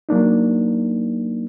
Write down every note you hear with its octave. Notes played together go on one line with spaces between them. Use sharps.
F#3 A#3 D4 D#4